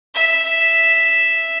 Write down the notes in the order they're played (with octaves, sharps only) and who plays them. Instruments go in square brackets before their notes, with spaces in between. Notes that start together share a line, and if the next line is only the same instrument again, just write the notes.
[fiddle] E5